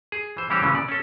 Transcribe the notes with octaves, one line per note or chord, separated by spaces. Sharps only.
G#4
E3 C5
E3 G3 C#4 F#4 G4 C5
C#3 E3 F3 G#3 C#4
D5
C#4 A4